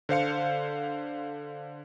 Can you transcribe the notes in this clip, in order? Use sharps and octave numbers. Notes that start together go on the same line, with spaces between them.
D3 C5 F5 C#7